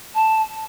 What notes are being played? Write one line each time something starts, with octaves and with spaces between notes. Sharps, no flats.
A5